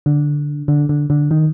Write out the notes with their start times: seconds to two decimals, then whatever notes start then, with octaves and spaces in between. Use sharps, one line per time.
0.06 D3
0.68 D3
0.89 D3
1.10 D3
1.31 D#3